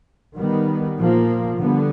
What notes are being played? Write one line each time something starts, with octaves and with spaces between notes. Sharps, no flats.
D#3 G3 B3
A#2 F3 A#3
D3 G3 B3